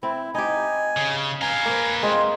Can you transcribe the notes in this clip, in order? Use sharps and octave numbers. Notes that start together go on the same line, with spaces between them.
C4 E4
D#4 G4 G#5
C#3
B4 F5 G#5 A#5
A#3 A#4 C5
G#3 C4 D#4 F4 G#5